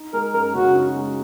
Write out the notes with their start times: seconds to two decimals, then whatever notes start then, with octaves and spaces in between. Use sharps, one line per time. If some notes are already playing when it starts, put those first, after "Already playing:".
Already playing: D#4
0.13 G#3 A#4
0.34 F#2 A#4
0.54 C#3 F#4
0.75 D#4
0.95 G#3